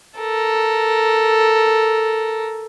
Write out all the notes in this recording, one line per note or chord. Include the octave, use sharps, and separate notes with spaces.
A4 A#4